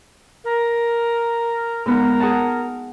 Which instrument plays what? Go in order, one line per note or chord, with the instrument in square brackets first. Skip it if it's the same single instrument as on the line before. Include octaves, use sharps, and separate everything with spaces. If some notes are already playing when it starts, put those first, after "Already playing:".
[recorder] A#4
[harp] G#2 B3 [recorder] A#4
[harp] G#4 F#5 A5